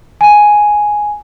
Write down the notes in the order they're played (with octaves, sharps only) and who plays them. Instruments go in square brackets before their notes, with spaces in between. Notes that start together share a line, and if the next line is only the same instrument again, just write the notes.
[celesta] G#5